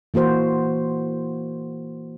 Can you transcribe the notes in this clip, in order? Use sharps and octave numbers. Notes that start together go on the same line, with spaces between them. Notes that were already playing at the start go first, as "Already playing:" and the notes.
E3 A#3 F#4 C5